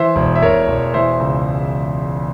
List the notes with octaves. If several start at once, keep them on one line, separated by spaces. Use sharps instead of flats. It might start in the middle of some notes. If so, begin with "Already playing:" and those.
Already playing: E3 C5 E5
E1
E5
E1 A#4 C#5
E1
E3 C5 E5
C#2